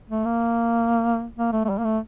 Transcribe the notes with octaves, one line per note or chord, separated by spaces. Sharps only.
A3
A#3
A#3
A3
A3
G3
A#3
A3